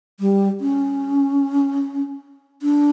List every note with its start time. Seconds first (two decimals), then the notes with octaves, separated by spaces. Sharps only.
0.20 G3
0.60 C#4
2.62 D4